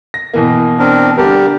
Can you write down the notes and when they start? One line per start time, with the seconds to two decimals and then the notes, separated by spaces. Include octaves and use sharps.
0.14 A#6
0.34 B2 E3 A#3
0.79 C4 D4 A#4
1.18 D3 G3 D4 G4 A#4